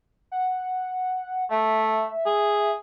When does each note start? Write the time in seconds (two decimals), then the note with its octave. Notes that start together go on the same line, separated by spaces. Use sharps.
0.32 F#5
1.51 A3 E5
2.26 G#4